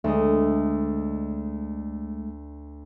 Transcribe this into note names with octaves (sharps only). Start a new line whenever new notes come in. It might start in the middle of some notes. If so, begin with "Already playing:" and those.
D2 G#3 A3 D#5